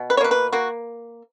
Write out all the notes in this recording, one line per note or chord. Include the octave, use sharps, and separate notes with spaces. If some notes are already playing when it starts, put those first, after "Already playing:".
Already playing: B2
B4
C#5
A#3 B4
B4
A#3 F#4